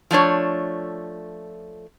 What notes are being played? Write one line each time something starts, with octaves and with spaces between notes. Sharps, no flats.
F3 A3 D4 C#5